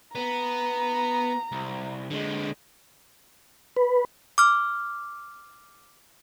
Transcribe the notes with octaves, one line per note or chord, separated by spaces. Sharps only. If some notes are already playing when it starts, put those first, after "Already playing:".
B3 A#5
C2
D3 G#3
B4
D6 F6